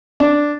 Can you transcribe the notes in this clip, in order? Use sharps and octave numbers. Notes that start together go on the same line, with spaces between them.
D4